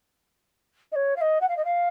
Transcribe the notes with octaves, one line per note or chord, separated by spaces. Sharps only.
D#5
C#5
F5
D#5
F#5
F5
D#5
F5